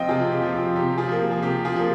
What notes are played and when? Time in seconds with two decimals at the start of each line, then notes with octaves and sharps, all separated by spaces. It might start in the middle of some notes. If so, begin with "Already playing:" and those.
Already playing: F3 C4 D#5 F5 G5
0.08 C3 F4 G#4
0.31 G4
0.42 F3 C4
0.53 F4
0.76 C3 G4
0.98 F4 G#4
1.09 F3 A#3
1.31 G#4
1.42 C3 G4
1.65 F4 G#4
1.76 F3 A#3